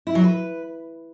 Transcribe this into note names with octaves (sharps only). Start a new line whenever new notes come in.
E4
F#3
B4